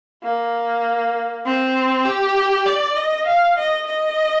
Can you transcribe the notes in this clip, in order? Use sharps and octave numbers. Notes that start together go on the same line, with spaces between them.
A#3
C4
G4
D5
D#5
F5
D#5
D#5